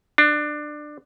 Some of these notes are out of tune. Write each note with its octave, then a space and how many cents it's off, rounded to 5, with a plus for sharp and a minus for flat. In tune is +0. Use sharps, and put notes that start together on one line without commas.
D4 +20